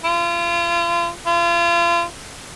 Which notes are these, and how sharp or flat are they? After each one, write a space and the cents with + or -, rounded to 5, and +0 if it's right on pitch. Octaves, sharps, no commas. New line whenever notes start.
F4 -35
F4 -35